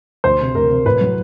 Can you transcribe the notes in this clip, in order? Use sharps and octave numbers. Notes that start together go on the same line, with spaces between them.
D2 C5
C3
D2 A#4
C3
A2 B4
F#3